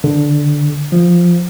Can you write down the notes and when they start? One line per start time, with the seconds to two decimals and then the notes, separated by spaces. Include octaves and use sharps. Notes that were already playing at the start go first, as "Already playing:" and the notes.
0.04 D3
0.92 F3